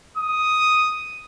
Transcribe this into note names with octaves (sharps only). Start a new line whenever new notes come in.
D#6